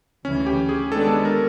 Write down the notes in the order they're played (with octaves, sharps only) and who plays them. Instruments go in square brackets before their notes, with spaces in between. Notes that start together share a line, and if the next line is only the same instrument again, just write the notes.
[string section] D2 C#3 E3 [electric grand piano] C#4
[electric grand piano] G4
G#4
[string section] D#3 G#3 B3 D4 [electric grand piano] A4
[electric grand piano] A4
A#4